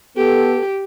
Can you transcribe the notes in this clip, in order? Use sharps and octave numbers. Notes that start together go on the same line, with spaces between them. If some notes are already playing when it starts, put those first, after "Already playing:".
B3 G4 A4